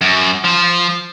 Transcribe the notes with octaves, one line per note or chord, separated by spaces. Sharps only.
F#2
F3